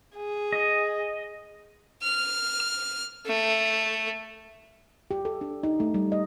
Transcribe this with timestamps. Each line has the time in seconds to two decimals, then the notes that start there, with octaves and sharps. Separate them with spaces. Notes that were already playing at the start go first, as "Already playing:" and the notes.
0.16 G#4
0.52 D#5
2.03 F6
3.26 A3
5.11 G4
5.25 A4
5.41 D4
5.63 D#4
5.80 A3
5.94 G3
6.12 D#5